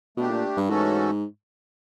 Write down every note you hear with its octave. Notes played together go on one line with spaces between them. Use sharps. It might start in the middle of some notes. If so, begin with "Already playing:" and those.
B2 A3 D4 G4
A#2
G2
G#2 E3 A3 C#4 F#4 A4